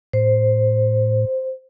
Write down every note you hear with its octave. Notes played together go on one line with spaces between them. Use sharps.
A2 C5